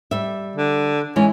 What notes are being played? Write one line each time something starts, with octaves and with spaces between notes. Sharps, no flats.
G3 E5
D3
E3 G#3 C#4